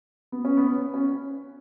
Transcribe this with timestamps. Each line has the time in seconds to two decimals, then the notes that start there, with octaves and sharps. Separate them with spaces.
0.32 B3
0.45 C#4
0.57 B3
0.94 C#4